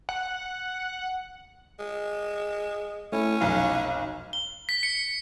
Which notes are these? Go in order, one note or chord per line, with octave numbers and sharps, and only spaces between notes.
F#5
G#3
A3 C#4 E4
F1 B1 F5
G7
B6
C#7